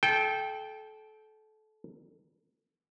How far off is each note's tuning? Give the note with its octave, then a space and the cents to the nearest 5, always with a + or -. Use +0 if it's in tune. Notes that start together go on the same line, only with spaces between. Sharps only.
A4 -30 G5 +0